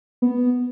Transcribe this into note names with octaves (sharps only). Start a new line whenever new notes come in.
B3